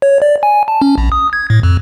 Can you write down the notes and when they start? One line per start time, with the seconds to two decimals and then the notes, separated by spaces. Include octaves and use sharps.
0.02 C#5
0.22 D5
0.43 G#5
0.68 A5
0.81 C#4
0.98 A#1
1.12 D#6
1.33 G#6
1.50 A2
1.63 F2